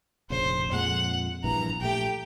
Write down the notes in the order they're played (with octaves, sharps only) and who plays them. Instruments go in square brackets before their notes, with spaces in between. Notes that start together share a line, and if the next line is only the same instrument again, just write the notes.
[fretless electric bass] F1 A#1 C#3 [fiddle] C5
[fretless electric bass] F2 A#2 G#3 [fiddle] F#5
[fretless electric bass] A#1 G2 E3 [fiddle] A#5
[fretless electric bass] A#1 A3 [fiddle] G4 G5